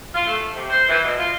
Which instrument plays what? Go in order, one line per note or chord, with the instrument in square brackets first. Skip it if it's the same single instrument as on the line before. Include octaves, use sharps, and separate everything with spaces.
[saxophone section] F4
A3
C3
C5
E3
B2
F4